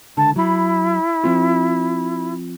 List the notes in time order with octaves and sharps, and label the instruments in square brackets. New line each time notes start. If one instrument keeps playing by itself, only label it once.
[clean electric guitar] C#2 D3 [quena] A5
[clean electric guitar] F#3 B5 [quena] E4
[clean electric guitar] F3 C4 F4